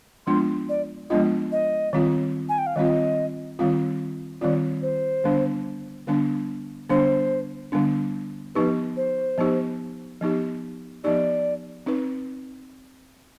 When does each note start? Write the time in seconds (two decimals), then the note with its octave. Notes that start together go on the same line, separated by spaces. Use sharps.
0.27 F3 G#3 B3 D4 F4 C6
0.69 D5
1.10 F3 G#3 B3 D4 F4 D#5
1.52 D#5
1.93 D#3 G3 C4 F4
2.49 G#5
2.58 G5
2.67 F5
2.76 D#3 G3 C4 F4 D#5
3.59 D#3 G3 C4 F4
4.41 D#3 G3 C4 F4 D5
4.82 C5
5.24 D3 G3 B3 D4
6.07 D3 G3 B3 D4
6.89 D3 G3 B3 D4 C5
7.72 D3 G3 B3 D4
8.55 F3 B3 D#4 G4 B4
8.97 C5
9.38 F3 B3 D#4 G4
10.21 F3 B3 D#4 G4
11.04 F3 B3 D#4 G4 D5
11.86 C4 D#4 B4